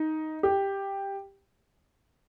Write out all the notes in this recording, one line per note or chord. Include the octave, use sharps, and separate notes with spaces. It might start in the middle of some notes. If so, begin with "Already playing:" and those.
Already playing: D#4
G4